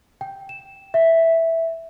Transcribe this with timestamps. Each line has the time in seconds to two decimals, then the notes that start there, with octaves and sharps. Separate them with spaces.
0.21 G5
0.49 E7
0.94 E5